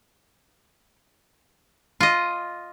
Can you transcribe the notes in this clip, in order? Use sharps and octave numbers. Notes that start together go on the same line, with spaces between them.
F4 D#5